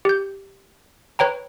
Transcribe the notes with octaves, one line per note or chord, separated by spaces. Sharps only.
G4 G6
B4 C#5 G5 A#5